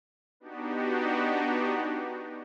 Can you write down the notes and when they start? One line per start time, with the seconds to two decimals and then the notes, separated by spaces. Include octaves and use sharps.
0.40 B3 D4 D#4 F#4 G4